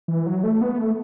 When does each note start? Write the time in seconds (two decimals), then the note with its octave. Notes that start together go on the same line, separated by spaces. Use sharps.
0.08 E3
0.26 F#3
0.44 A3
0.61 B3
0.79 A3